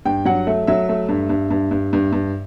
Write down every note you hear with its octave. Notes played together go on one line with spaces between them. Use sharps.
G2 G5
F#3 F#5
A3 E5
F#3 E5
A3
G2
G2
G2
G2
G2
G2